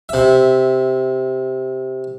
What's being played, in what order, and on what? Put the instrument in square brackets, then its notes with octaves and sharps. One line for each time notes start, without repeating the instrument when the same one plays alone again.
[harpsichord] C3 E5